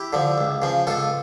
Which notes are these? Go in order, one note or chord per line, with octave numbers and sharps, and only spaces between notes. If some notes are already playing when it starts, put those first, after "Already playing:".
Already playing: E4 G4
D3 F3
C#2
C#3 F3
C#2 F4 A4